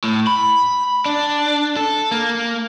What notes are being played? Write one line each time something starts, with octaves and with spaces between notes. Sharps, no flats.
A2
B5
D4
A4
A#3